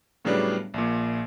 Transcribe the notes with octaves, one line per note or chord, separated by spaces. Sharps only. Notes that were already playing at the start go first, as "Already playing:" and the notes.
A2 C#3 F#3 G3 B3 D4
A#1 A#2